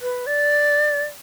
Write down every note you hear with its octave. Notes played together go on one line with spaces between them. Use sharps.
B4
D5